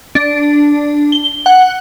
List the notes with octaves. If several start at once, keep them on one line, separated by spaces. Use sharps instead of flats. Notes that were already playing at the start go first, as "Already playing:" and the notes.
D4
G7
F#5